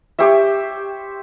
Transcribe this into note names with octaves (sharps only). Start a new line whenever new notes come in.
G4 C5 C#5 E5